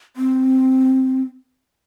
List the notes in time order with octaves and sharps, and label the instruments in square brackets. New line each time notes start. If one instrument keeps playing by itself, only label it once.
[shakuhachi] C4